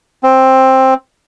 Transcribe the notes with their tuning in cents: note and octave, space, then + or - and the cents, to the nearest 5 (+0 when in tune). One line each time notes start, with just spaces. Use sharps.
C4 +10